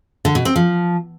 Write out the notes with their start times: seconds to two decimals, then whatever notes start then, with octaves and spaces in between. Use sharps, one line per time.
0.25 D3
0.35 B2
0.45 C4
0.56 F3